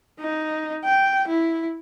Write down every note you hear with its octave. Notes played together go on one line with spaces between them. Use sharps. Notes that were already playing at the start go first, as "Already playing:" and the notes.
D#4
G5
E4